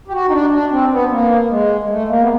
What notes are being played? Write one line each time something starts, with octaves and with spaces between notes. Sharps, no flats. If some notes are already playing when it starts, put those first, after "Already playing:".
G4
F#4
D#4
D4
D4
C4
B3
A#3
G#3
G#3
A3
A#3
B3